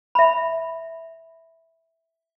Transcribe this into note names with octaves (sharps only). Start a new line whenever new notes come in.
E5 B5